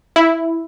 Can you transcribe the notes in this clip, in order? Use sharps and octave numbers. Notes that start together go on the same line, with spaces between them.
E4